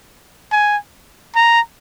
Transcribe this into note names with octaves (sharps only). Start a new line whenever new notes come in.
G#5
A#5